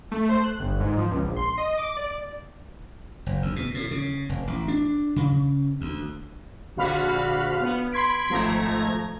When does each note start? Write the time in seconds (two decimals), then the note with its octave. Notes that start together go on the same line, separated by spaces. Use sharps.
0.12 A3
0.29 C5
0.44 F#6
0.60 G1
0.80 G#2
0.97 F3
1.11 C#2
1.23 A#1
1.36 C6
1.58 D#5
1.78 D6
1.97 D5
3.26 F#1
3.42 D2
3.56 B2
3.74 A2
3.91 C#3
4.29 F1
4.47 A1
4.68 D4
5.16 C#3
5.81 D2
6.76 A#1 D3 F#4 F5 B5 F6
7.60 B3
7.92 B5 C6 G#6 B6 D7
8.29 G#1 F3 A3 A#5 G#6